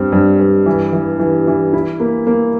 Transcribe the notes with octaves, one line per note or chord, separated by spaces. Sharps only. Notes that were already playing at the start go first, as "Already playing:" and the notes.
Already playing: G2 C4
G2
G2
E3
E3
E3
E3
E4
A#3
A#3